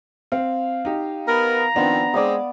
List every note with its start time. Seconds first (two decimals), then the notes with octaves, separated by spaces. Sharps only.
0.32 C4 F5
0.85 D#4 G4
1.28 B3 A#4 A#5
1.76 D#3 F3 B3 C4 D4
2.14 G#3 C4 D5 D6 D#6